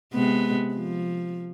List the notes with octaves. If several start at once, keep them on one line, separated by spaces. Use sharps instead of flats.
C3 G#3 B3
F3